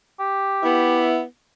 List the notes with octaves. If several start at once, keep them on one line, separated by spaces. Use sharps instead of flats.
G4
B3 E4